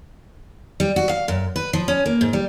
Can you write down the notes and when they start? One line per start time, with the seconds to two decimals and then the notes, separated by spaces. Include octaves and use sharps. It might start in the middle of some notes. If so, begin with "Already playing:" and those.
0.80 G3
0.96 F#4
1.09 F5
1.28 F#2
1.56 B4
1.73 F3
1.88 C#4
2.06 A#3
2.21 G#2
2.33 G3